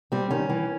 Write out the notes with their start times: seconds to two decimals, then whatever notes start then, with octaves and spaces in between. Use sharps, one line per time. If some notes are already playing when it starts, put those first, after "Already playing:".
0.12 G3 C4
0.30 D#3 C#4
0.49 E3